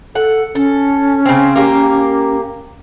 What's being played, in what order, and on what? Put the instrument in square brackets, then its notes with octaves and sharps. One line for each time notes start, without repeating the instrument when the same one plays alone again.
[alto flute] A4 [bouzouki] F#5
[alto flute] C#4 [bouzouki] A4
[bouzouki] C#3 C4
A#3 G4